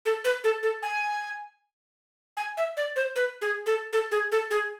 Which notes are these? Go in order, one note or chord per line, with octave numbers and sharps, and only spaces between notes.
A4
B4
A4
A4
G#5
G#5
E5
D5
C5
B4
G#4
A4
A4
G#4
A4
G#4